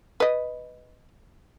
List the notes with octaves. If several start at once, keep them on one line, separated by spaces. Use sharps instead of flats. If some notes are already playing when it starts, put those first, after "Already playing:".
B4 D#5